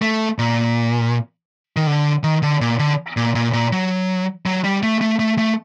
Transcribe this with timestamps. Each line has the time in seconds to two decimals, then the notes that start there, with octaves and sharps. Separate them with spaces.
0.02 A3
0.38 A#2
1.77 D#3
1.87 D3
2.23 D#3
2.43 D3
2.61 A#2
2.79 D3
3.17 A#2
3.35 A#2
3.53 A#2
3.72 F#3
4.46 F#3
4.64 G3
4.83 A3
5.01 A3
5.19 A3
5.38 A3